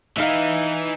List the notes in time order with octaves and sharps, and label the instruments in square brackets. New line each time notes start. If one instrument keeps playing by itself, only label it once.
[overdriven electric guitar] E3 [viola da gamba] D#4 [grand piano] E5 F5